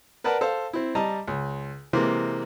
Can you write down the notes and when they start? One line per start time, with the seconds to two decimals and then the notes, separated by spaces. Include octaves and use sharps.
0.24 A#4 B4 D5 F#5 A5
0.41 A4 C5 F5
0.73 C4 E4
0.95 G3 D#5 A5 A#5
1.28 C#2
1.93 C3 E3 G#3 A#3 C4